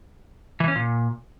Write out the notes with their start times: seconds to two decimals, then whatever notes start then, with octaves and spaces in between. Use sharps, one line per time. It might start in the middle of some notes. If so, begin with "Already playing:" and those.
0.60 E3
0.68 C#4
0.76 A#2